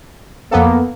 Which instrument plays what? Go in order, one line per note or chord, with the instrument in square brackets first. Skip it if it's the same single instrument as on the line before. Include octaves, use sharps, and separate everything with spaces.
[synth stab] F2 B3 A4 [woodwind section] A#3